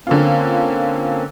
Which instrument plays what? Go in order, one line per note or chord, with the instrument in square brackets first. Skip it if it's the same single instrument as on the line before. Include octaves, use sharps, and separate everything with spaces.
[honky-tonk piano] D3 F4 [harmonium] A#3 C4 C#4